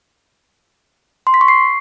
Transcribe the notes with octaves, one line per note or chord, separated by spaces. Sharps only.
C6
B6
C#6
C7